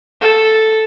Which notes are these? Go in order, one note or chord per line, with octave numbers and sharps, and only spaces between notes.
A4